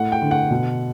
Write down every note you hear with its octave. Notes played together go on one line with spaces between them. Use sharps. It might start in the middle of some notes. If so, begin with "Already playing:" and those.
Already playing: A2 A3 F#5
G5
D3
F#5
B2